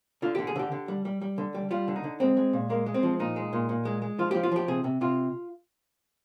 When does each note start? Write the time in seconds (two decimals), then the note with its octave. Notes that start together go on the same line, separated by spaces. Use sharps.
0.22 D3 F4
0.35 G4
0.39 D3
0.47 G#4
0.56 D3 G4
0.72 D3
0.88 G3
1.05 G3
1.21 G3
1.38 D3
1.55 G3
1.71 G3 F4
1.88 D3
1.96 D#4
2.04 D3
2.20 G#3 C4
2.37 G#3
2.53 A#2
2.70 G#3 A#3
2.86 G#3
2.94 C4
3.03 F3
3.19 A#2 D#4
3.36 G#3
3.53 A#2
3.69 A#2
3.85 G#3
4.02 G#3
4.18 F3 F4
4.31 G4
4.35 F3
4.43 F4
4.52 F3 G4
4.68 C3 G#4
4.84 C3
5.01 C3 F4